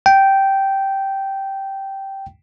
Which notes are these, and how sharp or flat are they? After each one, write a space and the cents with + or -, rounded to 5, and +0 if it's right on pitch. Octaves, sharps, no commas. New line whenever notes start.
G5 -10